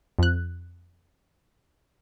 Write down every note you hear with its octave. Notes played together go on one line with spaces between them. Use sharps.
F2 F#6